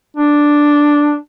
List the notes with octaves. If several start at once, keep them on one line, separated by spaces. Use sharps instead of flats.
D4